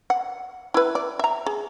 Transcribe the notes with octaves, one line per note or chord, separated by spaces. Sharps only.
F#5
E4 B4
D5
E5 A#5
G#4